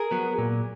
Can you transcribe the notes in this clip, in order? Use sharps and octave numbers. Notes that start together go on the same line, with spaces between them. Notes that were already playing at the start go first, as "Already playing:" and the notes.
Already playing: G#4 A#4
F#3 B3
A#2